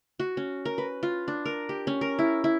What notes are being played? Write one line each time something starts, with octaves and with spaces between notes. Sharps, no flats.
F#4
C#4
A#4
B4
F4
D4
A#4
G4
C#4
A#4
E4
E4